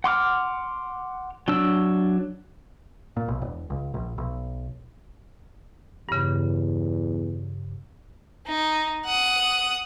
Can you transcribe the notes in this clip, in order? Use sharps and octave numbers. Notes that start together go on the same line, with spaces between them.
F#5 C6 D6 F6
F#3 D4 E6
A#2
B1
E1
C#2
A#1
B1
E2 G2 C#3
D#4
F#5 D#6